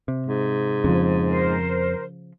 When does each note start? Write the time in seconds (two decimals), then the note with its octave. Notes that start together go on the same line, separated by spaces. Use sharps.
0.08 C3
0.27 G#2
0.84 F2 C#3 F3
1.30 A#4 C5